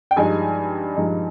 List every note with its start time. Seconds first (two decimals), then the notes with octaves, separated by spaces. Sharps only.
0.11 G5
0.16 G2 F3 G#3 D#4 G#5
0.96 G2 F3 G#3 D#4